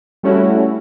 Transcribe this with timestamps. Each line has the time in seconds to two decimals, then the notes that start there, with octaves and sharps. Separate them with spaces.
0.23 G3 A3 C#4 E4 F#4